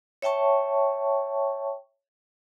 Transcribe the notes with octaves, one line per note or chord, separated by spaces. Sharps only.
C#5 E5 G5 A5 C#6